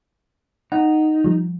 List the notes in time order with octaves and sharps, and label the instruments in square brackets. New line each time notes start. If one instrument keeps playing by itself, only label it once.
[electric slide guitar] D#4 [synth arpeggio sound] F#5
[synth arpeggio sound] F3 G3